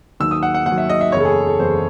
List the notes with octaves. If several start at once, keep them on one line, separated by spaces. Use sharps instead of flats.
D#2 D#3 F#3 E6
D#6
F#5
F#5
D#2 D#3 F#3 F#5
E5
D#5
E5
F#1 E2 C#3 C#5
A4
G#4
A4
F#1 E2 C#3 C5